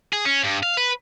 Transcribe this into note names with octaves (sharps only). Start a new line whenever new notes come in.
G#4
C#4
G2
F5
B4